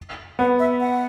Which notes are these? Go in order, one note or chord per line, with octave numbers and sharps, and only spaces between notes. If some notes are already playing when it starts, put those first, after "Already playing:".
B3 F#5
E5
F#5